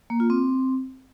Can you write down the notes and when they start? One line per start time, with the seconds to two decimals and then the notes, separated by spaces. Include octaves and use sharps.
0.10 A#3
0.20 F4
0.30 C4